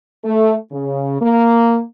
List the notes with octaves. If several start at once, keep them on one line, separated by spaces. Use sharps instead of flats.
A3
C#3
A#3